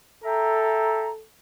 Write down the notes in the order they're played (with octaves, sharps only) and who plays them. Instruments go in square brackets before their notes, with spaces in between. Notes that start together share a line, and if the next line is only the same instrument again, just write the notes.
[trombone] A4 [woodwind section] E5 G5 A#5